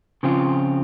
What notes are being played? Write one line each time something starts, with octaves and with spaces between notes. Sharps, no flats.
C#3 F3 C4 F4